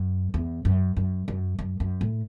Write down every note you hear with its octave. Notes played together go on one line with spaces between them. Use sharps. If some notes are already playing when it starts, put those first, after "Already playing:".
Already playing: F#2
E2
F#2
F#2
F#2
F#2
F#2
A2